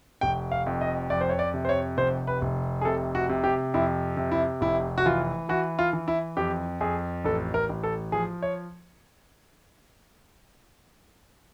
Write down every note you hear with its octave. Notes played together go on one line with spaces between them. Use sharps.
F1 G5
F5
F2
D#5
F2 D5
C5
C#5
D5
C3
C5
C#5
F1 C5
B4
F1
G#4
C3 A4
F#4
C3
G4
F2 E4
C3
E4
F1 E4
F#4
E3 F4
E3 F#4
F4
E3
E4
F2 G4
F2 G#4
A1 A4
A#4
A1
A4
F3 G#4
C#5